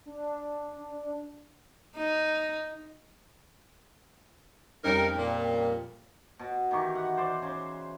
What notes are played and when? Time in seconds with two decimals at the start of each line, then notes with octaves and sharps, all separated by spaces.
0.06 D4
1.98 D#4
4.84 F2 G3 C#4 D#4 A#4
5.17 A#2
6.39 B2
6.71 D#3 E3 G4 C#6
6.95 F#5
7.17 C5 D5
7.42 C#3 C5